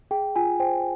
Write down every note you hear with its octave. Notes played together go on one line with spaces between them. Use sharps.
G#4 G5
F4 G#5
C5 G5